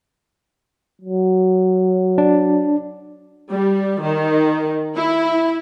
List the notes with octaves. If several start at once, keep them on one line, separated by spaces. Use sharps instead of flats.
F#3
D4
G3
D#3
E4